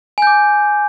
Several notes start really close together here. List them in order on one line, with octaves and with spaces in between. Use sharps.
G#5 G6 D6